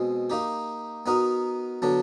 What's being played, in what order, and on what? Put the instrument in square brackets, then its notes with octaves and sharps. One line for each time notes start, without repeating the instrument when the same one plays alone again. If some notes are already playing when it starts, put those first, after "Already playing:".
Already playing: [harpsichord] B2 G#3 C4
A#3 D#4 G4
B3 D#4 F#4 A#4 D#5
D3 F#3 B3 D4